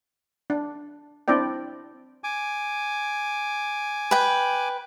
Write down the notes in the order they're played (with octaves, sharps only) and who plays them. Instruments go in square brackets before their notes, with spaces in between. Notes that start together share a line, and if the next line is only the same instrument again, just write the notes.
[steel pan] D4
C4 D4 E4 D5 G5
[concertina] G#5 D6
[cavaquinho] B4 G5